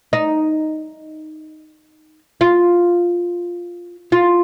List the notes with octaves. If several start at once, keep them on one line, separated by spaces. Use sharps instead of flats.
D#4
F4
F4